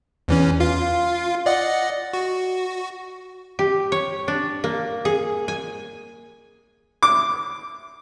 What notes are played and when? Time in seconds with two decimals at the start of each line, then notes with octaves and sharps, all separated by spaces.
0.28 E2 E3 C#4
0.60 F4 F5
1.46 D5 D#5 F#5
2.13 F#4
3.59 G4
3.92 C#5
4.28 D4
4.64 A#3
5.05 G#4
5.48 G#5
7.03 D6